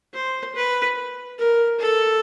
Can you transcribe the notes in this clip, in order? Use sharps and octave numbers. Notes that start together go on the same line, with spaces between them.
C5
B4
A#4
A4